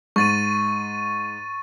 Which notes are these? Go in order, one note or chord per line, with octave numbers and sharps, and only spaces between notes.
G#2 C#6 A6 D#7